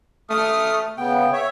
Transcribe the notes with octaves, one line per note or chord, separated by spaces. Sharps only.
A3 D#6 F6
C#3 B3 G5
C#5 E5